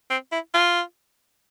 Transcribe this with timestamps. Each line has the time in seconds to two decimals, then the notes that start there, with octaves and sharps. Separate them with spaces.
0.10 C4
0.32 E4
0.54 F4